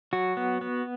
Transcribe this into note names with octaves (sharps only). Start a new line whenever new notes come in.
F#3 F#4
B3
B3